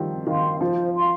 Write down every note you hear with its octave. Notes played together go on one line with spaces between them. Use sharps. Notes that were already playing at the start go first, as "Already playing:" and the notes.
Already playing: D#3 F3 G3 C4
D#3 F5 C6
F3 C5
F5 C6